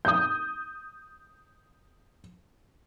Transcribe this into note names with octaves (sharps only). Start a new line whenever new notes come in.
D#6 G6